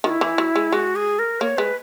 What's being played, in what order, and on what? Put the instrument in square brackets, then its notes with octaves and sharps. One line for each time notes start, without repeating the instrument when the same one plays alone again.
[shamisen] D#3 [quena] F#4
[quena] E4
[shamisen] E3
F#3
G#3
[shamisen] G#3 [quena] F#4
[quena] G#4
A#4
[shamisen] A#3 [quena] C#5
[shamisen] G#3 [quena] B4